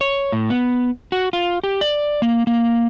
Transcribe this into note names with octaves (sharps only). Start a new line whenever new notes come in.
C#5
A2
B3
F#4
F4
G4
D5
A#3
A#3